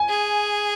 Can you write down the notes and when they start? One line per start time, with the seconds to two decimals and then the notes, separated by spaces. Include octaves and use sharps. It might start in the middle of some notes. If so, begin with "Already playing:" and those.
Already playing: G#5
0.09 G#4